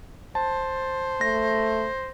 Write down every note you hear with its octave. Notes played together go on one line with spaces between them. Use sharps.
C5 A5
A3 A#6